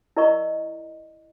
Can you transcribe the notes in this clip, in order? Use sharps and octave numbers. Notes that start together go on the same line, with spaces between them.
E4 A#4 D5 D#5 A#5 C#6